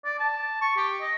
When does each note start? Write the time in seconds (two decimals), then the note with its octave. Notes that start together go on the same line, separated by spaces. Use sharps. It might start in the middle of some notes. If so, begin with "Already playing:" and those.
0.04 D5
0.19 A5
0.61 C#6
0.77 G4
1.01 D#5